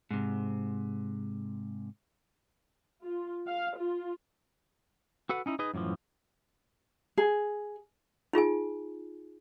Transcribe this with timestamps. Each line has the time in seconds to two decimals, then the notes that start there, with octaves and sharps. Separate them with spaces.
0.11 G#2 C3
3.04 F4
3.47 F5
3.78 F4
5.29 F#4 A4 B4 F#5
5.46 C#4 D#4 E4
5.59 D#4 G#4 B4 D#5
5.74 F#2 A2 E3 F3
7.18 G#4
8.33 D#4 F4 G#4 G#5